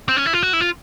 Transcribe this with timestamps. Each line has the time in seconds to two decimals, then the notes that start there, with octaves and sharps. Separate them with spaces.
0.09 C4
0.17 C#4
0.26 E4
0.33 F4
0.43 F#4
0.53 E4
0.61 F4